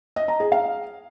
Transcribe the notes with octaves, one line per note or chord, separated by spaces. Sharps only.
D#5
A#5
G#4
F5